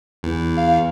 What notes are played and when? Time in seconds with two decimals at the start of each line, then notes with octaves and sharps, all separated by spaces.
0.23 E2
0.57 F5